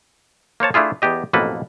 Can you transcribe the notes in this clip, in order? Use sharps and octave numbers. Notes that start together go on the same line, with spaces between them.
A#3 C5 C#5 A5
A3 D4 E4 F4 G#4
E2 B3 G4 D#5
A1 F2 B2 A#3 A4 B4